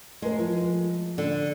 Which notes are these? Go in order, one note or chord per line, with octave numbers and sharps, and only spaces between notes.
G#3 A3 A#4
F3
D3